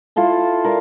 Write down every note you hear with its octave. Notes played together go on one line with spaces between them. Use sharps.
E4 F4 A4 C5
A#4 D5 F5